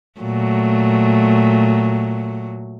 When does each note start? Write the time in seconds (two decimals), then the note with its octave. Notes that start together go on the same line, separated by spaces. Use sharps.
0.20 A#2 F#3 A3